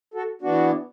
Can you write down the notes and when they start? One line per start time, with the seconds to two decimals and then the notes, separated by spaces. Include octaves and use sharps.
0.14 F#4 A4
0.42 E3 B3 D4 F#4